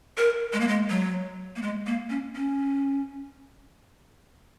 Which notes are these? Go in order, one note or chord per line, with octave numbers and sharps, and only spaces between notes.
A#4
G#3
A#3
G#3
F#3
A#3
G#3
A#3
C#4
C#4